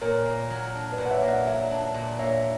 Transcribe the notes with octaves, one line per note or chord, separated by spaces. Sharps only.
A#2 A#4 C#5
A#3
F#3
D4
B4 D5
A#2
F#5
C#5 E5
A#3
D5 F#5
F#3 C#5 E5
D4
A#2
A#3 C#5 E5